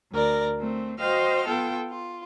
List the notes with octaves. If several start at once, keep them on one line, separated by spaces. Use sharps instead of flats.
D2 A#4 D5 A#6
A3 C4
F#4 C5 D#5 F5 G5 F6
B3 F4 A4 G5
F4